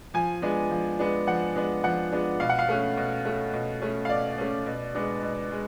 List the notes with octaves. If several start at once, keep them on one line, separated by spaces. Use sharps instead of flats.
F3 G#5
G#3 B3 D4
F3
G#3 B3 D4
F3 F#5
G#3 B3 D4
F3 F#5
G#3 B3 D4
B2 F5
F#5
F5
A3 C#4
B2
A3 C#4
B2
A3 C#4
F5
B2 D5
A3 C#4
B2
G#3 B3 D4
B2
G#3